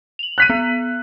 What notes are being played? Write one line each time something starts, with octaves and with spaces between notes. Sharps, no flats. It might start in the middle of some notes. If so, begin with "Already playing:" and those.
F7 F#7
F#6 B6 D#7
B3